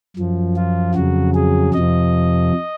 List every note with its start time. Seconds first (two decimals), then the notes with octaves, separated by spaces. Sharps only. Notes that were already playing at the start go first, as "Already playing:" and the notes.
0.17 F#2 F3
0.56 F4
0.94 F2 C#3 F#3 F#4
1.35 G#4
1.74 F2 C3 F3 D#5